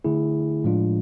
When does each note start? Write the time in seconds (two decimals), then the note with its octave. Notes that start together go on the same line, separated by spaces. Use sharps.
0.05 D3 A3 E4 G#4
0.64 A2 F3 G#3 D4 F4